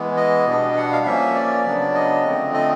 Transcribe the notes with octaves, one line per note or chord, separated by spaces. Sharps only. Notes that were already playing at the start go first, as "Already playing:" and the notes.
Already playing: E3 G#3 B3
D#5
B2 G3 B3 D4
F#5
F5
F3 A#3 C#4 E5
D5
C#3 F#3 B3 D4
D#5
D3 F3 A3 C4
D#5